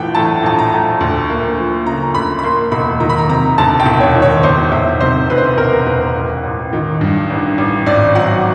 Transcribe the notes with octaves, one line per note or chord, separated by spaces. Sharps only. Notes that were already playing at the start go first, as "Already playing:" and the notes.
Already playing: A#1 E3 A3 F#5 G5
A2 A5
A#1 A5
A#5
A3
D2
A#3
F3
C#3 A#5
D2 B5
B5
A#3 C6
E1 B5
D#3 A#5
B5
A#5
C3 A#5
D2 A5
G5
E1
C#5
D#3
C#5
E1 C5
E1 E5
C3 C5
D2 B4
C5
B4
E1 A#4
E1 B4
A1
A1
D#3
G2
A1
A1
G#1 D5
F#3 F#5